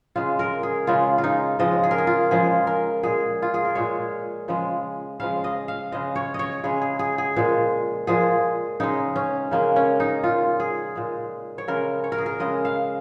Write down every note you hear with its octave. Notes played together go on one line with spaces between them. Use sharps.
C#3 G#3 F4
A#4
G#4
C#3 G#3 F4
F4
D#4
C#3 F3 G#3 D#5
G#4
A#4
G#4
F4
C#3 F3 G#3 G#4
A#4
A#2 G#3 G#4
F4
G#4
A#4
A#2 G#3 C#5
C#3 F3 G#3
C#3 F3 G#3 F5
D#5
F5
C#3 G#3 D#5
C#5
C#5 D#5
C#3 G#3 G#4
G#4
G#4
G#4
A#2 F3 G#3
A#2 F3 G#3 G#4
C#3 G#3 D#4
C#4
C#3 G#3 A#3
C#4
D#4
A#2 G#3 F4
G#4
A#2 G#3
C#5
C#3 G#3 A#4
C#5
A#4
G#4
A#4
C#3 G#3 D#5
F5